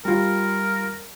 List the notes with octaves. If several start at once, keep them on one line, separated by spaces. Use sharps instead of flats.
G3 F4 A#4